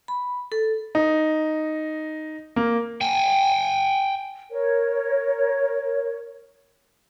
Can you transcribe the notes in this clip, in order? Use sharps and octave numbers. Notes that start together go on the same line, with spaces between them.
B5
A4
D#4
A#3
G5 G#5
A#4 C#5